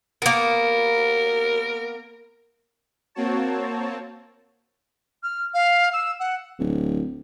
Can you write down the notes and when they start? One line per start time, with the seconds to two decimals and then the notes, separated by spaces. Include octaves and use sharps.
0.22 A#3 B3 A#4
3.15 A#3 C4 F#4 C#5 A5
5.23 F6
5.54 F5
5.93 E6
6.20 F#5
6.59 D1